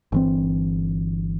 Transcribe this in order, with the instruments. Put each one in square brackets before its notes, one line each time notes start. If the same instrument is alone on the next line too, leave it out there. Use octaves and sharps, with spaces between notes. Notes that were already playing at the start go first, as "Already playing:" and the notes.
[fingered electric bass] G1 E3 C4